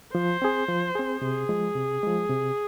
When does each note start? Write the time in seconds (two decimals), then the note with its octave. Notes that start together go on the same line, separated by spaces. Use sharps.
0.14 F3 C5
0.42 C4 G#4
0.68 F3
0.95 C4 G#4
1.22 C3 G#4
1.49 F3 G#3
1.76 C3
2.03 F3 G#3
2.29 C3